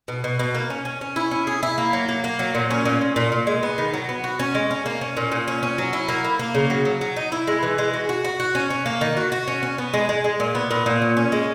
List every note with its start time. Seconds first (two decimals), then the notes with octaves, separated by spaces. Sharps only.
0.08 B2
0.24 B2
0.39 B2
0.55 A#3
0.70 C#4
0.85 C#4
1.01 C#4
1.16 E4
1.31 C#4
1.47 G#4
1.63 E4
1.78 A#3
1.93 F#3
2.09 A#3
2.24 A#3
2.39 F#3
2.55 A#2
2.70 C#4
2.85 A#2
3.01 A#2
3.16 A#2
3.32 A#2
3.47 G#3
3.63 B3
3.78 D#3
3.94 F#3
4.09 B3
4.24 F#4
4.39 C#4
4.55 G#3
4.71 C#4
4.86 A#3
5.01 C#4
5.17 A#2
5.32 A#2
5.48 C#4
5.63 C#4
5.78 F#3
5.93 E4
6.08 A#3
6.24 A#3
6.39 A#3
6.55 C#3
6.70 F#3
6.85 F#3
7.01 F#3
7.16 D#4
7.32 E4
7.47 G#3
7.63 E3
7.78 G#3
7.94 F#4
8.09 F#4
8.24 F#4
8.40 F#4
8.55 C#4
8.70 C#4
8.86 A#3
9.01 D#3
9.17 F#4
9.32 F#4
9.48 C#4
9.63 C#4
9.78 B3
9.93 G#3
10.09 G#3
10.24 G#3
10.40 A#2
10.55 B3
10.71 A#2
10.86 A#2
11.02 C#4
11.17 C#4
11.32 G#3